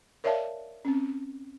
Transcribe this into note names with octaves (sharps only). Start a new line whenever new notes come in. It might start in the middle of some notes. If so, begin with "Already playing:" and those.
A#4 C#5 D5 E5 F5 A5
C4 C#4